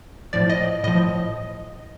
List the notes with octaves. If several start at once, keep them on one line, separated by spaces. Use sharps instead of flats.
A2 F3 D5
D#5
A2 F3 D#5